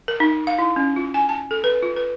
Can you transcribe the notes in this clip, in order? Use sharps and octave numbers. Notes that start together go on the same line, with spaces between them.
A#4
D#4
F5
E4
C#4
F4
G#5
A5
A4
B4
F4
B4